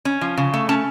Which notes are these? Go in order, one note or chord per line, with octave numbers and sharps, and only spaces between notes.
C#4
F3
C#3
A3
C#4 A5